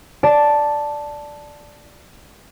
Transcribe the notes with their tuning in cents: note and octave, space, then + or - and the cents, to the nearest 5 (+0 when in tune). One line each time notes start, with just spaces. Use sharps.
D5 +0 A5 +0